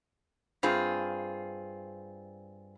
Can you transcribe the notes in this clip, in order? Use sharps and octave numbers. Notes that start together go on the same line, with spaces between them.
G2 C4 F4 G#4